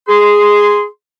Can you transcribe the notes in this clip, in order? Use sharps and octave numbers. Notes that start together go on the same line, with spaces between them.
G#4 C6